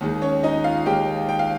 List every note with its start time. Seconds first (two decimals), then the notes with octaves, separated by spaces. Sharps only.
0.01 D#2 D#3 G#3
0.22 C#4 C#5
0.43 D#4 D#5
0.64 F4 F5
0.86 D#2 D#3 G#3 G4 G5
1.29 G5
1.39 F5